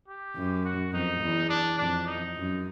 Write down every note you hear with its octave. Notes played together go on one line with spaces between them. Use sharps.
G4
F#2
F#4
F2 D#4
E2
D4
F2 D4
D#4
F#2